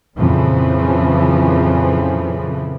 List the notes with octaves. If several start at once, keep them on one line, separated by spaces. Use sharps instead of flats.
F2 A#2 C#3 E3 F3